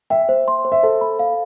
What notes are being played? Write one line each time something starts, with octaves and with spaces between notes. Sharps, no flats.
E5 G5
C5
C6
C5
E5
A4 C5
B5
F5